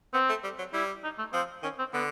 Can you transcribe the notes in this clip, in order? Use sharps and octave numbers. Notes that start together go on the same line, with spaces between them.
B3 C4
A3
G3
F#3
G3 E4
D#4
A3
F3 C4
D#3 C#4
C4
D3 B3